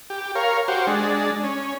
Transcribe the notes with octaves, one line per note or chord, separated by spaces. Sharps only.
G4
A#4 C#5 F5
F#4 G4 C5
G#3 D4
C#4